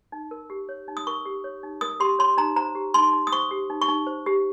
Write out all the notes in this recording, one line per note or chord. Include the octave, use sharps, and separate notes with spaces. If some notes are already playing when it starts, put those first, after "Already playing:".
D#4
A#4
G4
C#5
D#4
D#6
A#4 C#6
G4
C#5
D#4
A#4 D#6
G4 C6
C#5 C6
D#4 A#5
C5 A#5
G4
D#4 C6
D#4
D#6
C5 C#6
G4
D#4
C#6
D#4
C5
G4